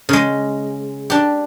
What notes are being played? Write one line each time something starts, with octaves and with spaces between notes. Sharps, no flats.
C#3 G#3
D4 G4